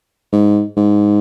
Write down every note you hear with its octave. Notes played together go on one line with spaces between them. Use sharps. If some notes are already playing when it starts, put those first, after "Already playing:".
G#2
G#2